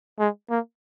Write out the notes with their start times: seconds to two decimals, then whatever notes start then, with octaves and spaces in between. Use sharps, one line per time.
0.19 G#3
0.50 A#3